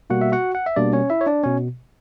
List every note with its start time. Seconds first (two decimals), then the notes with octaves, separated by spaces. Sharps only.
0.10 B2 G3 A#3 F#4 F#5
0.21 E5
0.32 F#4 F#5
0.55 F#5
0.66 E5
0.76 B2 G3 A#3 D4 D5
0.93 C#4 C#5
1.10 E4 E5
1.21 C#5
1.27 D4 D5
1.44 B2 C#4 C#5